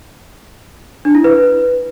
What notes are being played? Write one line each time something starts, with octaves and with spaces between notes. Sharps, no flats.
D4
E4
B4